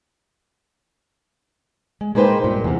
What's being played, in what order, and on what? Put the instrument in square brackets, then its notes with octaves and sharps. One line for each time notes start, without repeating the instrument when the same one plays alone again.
[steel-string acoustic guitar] G#3
G#3 A#3 D#4 B4 C5 G5
G2 A#2
E2 C3